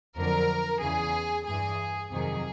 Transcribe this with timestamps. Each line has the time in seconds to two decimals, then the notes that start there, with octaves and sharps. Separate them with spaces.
0.16 F2 D3 F#3 A#4
0.81 E2 C#3 E3 G#4
1.46 G2 E3 G#4
2.12 F2 C3 D#3 F#3 G#4